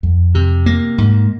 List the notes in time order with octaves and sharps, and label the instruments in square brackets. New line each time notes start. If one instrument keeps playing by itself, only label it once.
[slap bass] F2
C3
A#3
G#2